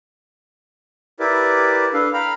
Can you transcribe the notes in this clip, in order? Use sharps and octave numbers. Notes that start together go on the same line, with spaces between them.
E4 G4 A#4 B4 D5 E5
D4 A4 B4 F5
F5 G5 A#5 B5 F6